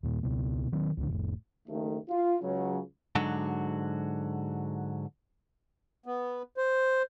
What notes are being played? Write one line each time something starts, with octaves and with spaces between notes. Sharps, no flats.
D#2 A#2
C#2 B2 B3
D#3 F#3 C4
C#2 A#2 D3
F1 A2
F#1 D#2 D#3 A3
F4
C#2 C#3 F#3
G#2 D3 F#3 F#4
B3
C5